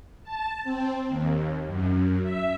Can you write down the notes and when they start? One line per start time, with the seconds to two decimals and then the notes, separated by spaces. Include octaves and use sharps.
0.24 A5
0.64 C4
1.09 D#2
1.67 F#2
2.23 E5